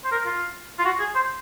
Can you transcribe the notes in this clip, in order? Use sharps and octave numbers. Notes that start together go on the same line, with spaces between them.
C5
A#4
F4
F4
F#4
G#4
C5